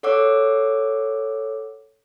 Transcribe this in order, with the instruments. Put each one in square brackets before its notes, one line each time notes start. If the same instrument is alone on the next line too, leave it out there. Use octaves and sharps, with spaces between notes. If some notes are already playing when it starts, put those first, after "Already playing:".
[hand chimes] A4 C#5 F#5 D6 E6